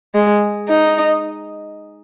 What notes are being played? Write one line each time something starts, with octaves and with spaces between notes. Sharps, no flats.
G#3
D#4